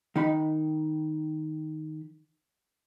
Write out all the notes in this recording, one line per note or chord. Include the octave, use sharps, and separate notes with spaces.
D#3 D#4 B5